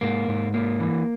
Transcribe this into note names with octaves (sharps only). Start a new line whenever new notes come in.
G#2 A#3
G#2
A#3
E3